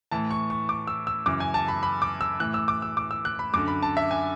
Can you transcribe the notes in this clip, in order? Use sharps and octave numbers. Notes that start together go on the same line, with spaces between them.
A2 E3 A5
C#6
C#6
D6
E6
E6
F#2 C#3 E3 D6
G#5
A5
B5
B5
D6
E6
A2 E3 F#6
E6
D6
E6
D6
E6
F#6
B5
F#2 D3 D6
B5
A5
E5
G#5